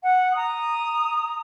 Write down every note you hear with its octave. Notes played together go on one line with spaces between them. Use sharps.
F#5
A#5 D#6